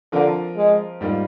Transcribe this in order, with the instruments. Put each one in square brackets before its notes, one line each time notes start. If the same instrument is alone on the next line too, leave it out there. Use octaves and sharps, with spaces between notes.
[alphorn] D3 [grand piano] F3 C4 F4 A#4
[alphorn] G#3
[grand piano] G#2 G3 A#3 F4